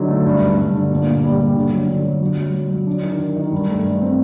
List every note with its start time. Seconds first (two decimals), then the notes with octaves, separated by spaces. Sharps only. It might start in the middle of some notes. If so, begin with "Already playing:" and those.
Already playing: D3 F#3 D#4
0.08 A3
0.26 G2
0.42 G2
0.58 G2
0.74 D3
0.91 A#2
1.07 A#2
1.23 G3
1.39 G3
1.56 D3
1.72 F#3
1.89 D3
2.04 F#3
2.21 F#3
2.37 F#3
2.54 F#3
2.70 F#3
2.87 D4
3.03 D#3
3.19 D#3
3.36 D#3
3.52 G2
3.69 A3
3.85 G2
4.02 C4